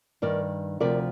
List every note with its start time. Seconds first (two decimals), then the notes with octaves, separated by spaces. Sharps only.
0.22 G2 D#3 A#4 D5
0.80 D2 C3 F3 A#4 D5